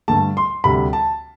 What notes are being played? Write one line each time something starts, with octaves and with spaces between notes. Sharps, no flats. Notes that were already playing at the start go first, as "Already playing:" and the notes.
G2 D3 A3 A5
C6
D2 C3 G3 B5
A5